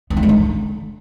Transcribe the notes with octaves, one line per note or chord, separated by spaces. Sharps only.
B3
A#3
G#3
D3